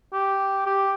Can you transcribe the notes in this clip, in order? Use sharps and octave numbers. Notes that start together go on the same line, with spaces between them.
G4
G4